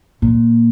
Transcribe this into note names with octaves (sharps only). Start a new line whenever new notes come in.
A#2